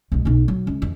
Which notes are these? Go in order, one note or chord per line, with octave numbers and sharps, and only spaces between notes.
B1 G#3
B1 D#4
F#3
C#2
F2 E3